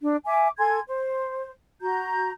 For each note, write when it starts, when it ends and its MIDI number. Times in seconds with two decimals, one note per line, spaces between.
0.01 0.17 62
0.25 0.49 76
0.25 0.49 80
0.25 0.49 86
0.58 0.79 69
0.58 0.79 80
0.58 0.79 84
0.58 0.79 92
0.88 1.51 72
1.81 2.30 66
1.81 2.30 82
1.81 2.30 91